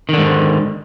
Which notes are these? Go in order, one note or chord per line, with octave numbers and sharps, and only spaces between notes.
G#2 D3 D#3